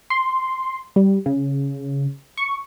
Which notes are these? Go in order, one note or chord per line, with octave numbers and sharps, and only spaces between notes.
C6
G3
C#3
C#6